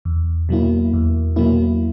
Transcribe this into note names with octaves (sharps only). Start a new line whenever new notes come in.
E2
B2 F#3 A#3 E4
E2
B2 F#3 A#3 E4